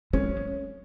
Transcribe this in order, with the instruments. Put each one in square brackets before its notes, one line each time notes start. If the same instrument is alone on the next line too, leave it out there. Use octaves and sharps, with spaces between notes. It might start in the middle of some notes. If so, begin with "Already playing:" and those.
[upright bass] G#3 [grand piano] C#4